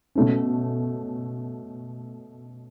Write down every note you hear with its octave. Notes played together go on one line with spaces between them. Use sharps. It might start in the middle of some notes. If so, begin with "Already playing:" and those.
B2 A3 C#4